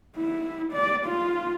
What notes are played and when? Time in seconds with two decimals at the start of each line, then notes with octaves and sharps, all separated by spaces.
0.17 E4
0.73 D5
1.06 F4